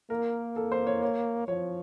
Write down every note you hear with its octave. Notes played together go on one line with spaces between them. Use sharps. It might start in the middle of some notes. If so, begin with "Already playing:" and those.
A#3 A#4
A4
C5
C#5
C#5
F3 C#5